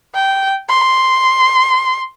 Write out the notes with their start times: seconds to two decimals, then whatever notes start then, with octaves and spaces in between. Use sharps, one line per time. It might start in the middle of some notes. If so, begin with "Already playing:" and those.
0.14 G5
0.69 C6